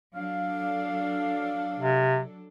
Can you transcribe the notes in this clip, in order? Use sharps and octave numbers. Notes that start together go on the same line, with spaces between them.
F#3 D4 A4 F5
C3